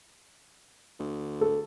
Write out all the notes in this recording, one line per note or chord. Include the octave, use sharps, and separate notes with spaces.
D2
A4